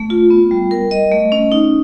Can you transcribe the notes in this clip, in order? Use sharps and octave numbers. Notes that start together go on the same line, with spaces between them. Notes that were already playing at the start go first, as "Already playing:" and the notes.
Already playing: A3
F4
B3
G3
A#4
D#5
A3
C#4
D#4